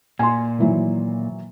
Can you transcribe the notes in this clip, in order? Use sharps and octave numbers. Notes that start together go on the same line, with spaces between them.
A#2 G#5 C6
D#3 E3 F#3